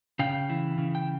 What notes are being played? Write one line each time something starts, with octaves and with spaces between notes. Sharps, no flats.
C#3 F5 G5
E3
C#3
G5